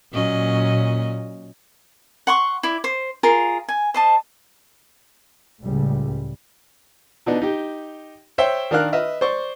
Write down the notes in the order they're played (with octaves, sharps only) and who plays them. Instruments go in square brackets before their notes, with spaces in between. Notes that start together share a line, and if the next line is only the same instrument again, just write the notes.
[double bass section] A#2 [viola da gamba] F#3 C#4 D#5
[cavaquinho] F#5 C6 C#6
E4 D5
C5
F4 G#4 A#4 F5
G#5
C5 D#5 A5
[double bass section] C#2 A2 G3
[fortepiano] B2 B3 D4 D#4
D#4 G4
C5 C#5 E5 G5
D#3 D4 A#4 F5 F6 F#6
B4 D#5 E5 F6
C5 D5 C#6